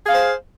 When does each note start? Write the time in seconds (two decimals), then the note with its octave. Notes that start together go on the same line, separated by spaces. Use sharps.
0.06 G#4
0.09 F5
0.12 C5